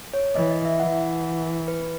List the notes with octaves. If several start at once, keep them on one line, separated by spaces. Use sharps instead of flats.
C#5
E3 D#5
D#5
E5
E3 F#5
B4